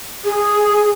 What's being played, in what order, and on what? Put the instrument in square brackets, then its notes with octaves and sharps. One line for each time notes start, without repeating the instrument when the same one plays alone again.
[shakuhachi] G#4